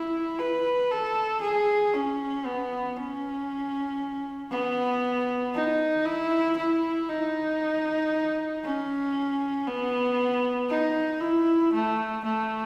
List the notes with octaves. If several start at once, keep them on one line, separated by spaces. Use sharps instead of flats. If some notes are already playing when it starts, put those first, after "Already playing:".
Already playing: E4
B4
A4
G#4
C#4
B3
C#4
B3
D#4
E4
E4
D#4
C#4
B3
D#4
E4
A3
A3